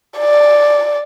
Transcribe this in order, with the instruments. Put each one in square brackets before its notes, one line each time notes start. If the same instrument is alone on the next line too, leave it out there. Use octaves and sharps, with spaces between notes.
[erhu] D5